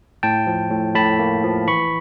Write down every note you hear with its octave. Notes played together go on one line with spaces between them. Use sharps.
A2 G5 A5
F3
A2
A2 A5 B5
A#3
F3
E3 B5 C#6